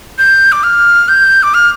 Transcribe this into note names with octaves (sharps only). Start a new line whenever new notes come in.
G6
D6
F6
G6
D6
F6